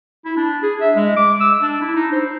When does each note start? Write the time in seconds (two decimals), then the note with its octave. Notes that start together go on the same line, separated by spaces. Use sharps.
0.25 E4
0.37 D4
0.63 G#4
0.81 E5
0.96 G#3
1.16 D6
1.40 E6
1.62 D4
1.81 E4
1.96 D#4
2.12 C5